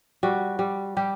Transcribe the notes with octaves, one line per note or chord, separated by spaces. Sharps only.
G3 F#4
G3
G3 G4